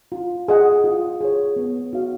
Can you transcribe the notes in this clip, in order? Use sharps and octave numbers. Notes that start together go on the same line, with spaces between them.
F4
G#4 D#5 F#5
F4
G#4 C#5
B3
D#4 F#4 C#5 F5